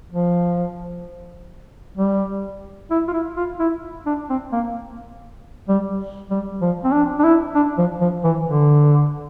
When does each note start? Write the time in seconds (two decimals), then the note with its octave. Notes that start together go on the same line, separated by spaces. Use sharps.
0.11 F3
1.97 G3
2.91 E4
3.08 F4
3.13 E4
3.37 F4
3.60 E4
4.06 D4
4.29 C4
4.52 A#3
5.69 G3
6.31 G3
6.62 F3
6.84 C4
6.92 D4
7.19 D4
7.24 E4
7.55 D4
7.78 F3
8.01 F3
8.24 E3
8.48 D3